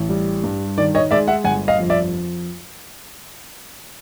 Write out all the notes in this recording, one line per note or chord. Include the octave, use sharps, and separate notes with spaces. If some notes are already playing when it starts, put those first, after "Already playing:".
Already playing: A1
G3
G2
D#3 D5
C#5 D#5
G#3 D5 E5
E5 F#5
G1 F#5 G#5
D#5 F5
F2
D5 E5